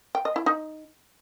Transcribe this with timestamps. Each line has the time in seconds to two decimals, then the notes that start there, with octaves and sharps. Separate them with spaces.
0.15 G5
0.25 D#5
0.36 E4
0.46 D#4